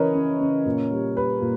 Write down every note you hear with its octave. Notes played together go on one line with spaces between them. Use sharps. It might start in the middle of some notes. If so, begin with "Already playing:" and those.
Already playing: C#3 E3 A#4 B4 C#5 D#5
C#3
C#3
A#2
G3
G3 B4
A#2